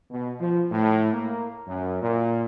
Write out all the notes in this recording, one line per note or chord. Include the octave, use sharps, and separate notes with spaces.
B2
F3
A2
A#3
F#2
A#2